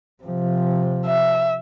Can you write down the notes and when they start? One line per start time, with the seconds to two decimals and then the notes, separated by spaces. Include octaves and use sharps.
0.23 C3 F3
1.06 E5